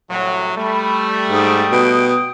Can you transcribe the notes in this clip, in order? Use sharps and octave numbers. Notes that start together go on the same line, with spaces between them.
C2 A2 F#3
G3 A3 B5
G#2 G5 D#6
B2